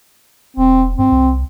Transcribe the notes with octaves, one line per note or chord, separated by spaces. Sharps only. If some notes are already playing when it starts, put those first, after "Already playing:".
E1 C4
G2 C4
C2